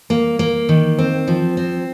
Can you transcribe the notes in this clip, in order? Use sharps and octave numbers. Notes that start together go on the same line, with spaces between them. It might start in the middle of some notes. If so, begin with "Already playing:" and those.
A#3
A#3
D#3
C4
F3
C4